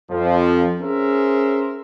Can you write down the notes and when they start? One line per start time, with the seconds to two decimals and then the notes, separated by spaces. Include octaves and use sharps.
0.11 F2 F3
0.82 C#4 G#4 A#4 C5 E5